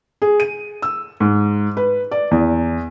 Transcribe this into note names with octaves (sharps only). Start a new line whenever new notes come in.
G#4
D#7
E6
G#2
B4
D5
E2